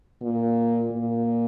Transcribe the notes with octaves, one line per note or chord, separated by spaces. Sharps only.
A#2
A#2